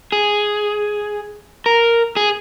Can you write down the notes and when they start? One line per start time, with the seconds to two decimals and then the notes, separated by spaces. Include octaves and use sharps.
0.12 G#4
1.66 A#4
2.17 G#4